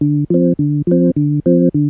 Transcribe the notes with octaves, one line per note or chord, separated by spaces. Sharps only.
D3
F3 C4
D3
F3 C4
D3
F3 C4
D3